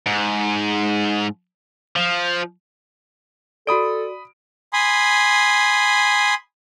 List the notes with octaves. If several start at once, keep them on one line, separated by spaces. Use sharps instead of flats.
G#2
F3
F#4 A4 D5 B5 D#6 D7
G#5 B5 C6 D#6